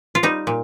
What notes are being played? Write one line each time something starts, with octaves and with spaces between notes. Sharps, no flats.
F4
G3 D#4
A#2